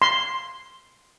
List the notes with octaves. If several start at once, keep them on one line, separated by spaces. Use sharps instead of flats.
C6